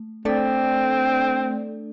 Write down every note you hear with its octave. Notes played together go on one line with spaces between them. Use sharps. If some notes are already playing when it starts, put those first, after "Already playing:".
Already playing: A3
A3 C4 D4 A4 D5